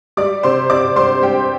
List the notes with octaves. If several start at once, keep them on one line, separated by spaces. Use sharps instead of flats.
G3 D5 D6
C3 C5 C6
C3 D5 D6
G3 C5 C6
G3 G4 G5